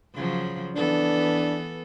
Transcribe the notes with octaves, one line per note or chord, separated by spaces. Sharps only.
C#3 F3 F#3
E3 B3 D4 A4